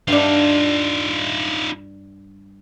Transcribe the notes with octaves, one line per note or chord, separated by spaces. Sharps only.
G2 D4 D#4 F4